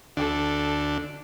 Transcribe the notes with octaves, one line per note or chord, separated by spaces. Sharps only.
D2 D4 A4